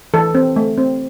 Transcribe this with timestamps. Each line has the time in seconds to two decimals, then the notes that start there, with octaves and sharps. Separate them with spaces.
0.14 E3 A4
0.35 C4
0.56 A3
0.78 C4